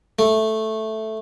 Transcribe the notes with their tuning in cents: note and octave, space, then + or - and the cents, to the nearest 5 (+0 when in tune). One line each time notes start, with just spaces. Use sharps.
A3 -5